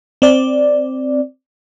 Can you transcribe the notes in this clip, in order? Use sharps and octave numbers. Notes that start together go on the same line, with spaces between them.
C4 D5